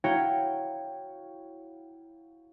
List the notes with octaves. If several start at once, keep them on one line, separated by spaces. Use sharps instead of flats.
E4 F#4 C#5 F5 G5 A#5